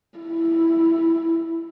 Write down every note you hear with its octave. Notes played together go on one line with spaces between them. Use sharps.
E4